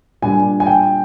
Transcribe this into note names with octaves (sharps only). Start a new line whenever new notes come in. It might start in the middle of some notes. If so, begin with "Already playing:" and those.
A#2 G3 D4 G#5
G#5
G5